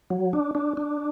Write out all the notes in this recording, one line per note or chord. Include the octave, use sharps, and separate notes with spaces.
F#3
D4
D4
D4